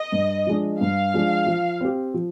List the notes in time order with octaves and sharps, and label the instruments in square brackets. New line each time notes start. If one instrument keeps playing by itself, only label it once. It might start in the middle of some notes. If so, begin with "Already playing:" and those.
Already playing: [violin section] D#5
[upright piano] G2
F3 G#3 D4
[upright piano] G2 [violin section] F5
[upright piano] F3 G#3 D4
F3
C4 G4
F3